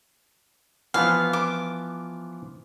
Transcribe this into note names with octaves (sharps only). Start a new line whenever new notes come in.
E3 F3 B3 F5
D6